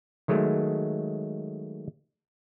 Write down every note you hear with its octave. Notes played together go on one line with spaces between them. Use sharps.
D#3 F#3 G#3 A3